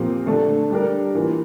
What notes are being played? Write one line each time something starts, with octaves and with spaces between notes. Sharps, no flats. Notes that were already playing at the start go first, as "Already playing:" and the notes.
Already playing: A#2 F3 C4 G4 A#4
D3 A3 D4 A4
G3 D4 G4 A#4
E3 A#3 F4